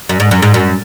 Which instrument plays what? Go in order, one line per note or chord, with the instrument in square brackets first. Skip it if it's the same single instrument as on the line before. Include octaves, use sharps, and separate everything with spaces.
[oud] F#2
G#2
F#2
G#2
F#2